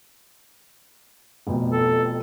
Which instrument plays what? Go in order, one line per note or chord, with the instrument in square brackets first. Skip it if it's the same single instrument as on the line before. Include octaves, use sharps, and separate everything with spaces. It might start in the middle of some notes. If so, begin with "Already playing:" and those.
[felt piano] F1 F2 B2
[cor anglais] A4